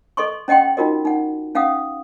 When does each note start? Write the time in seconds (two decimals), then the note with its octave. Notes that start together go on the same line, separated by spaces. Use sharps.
0.17 A4 D#5 C6 C#6
0.48 C#4 D#5 F#5 G5 C6
0.77 D#4 F4 F#4 A#4 D#5
1.05 D#4 F#5
1.55 C#4 F5 F#5 D#6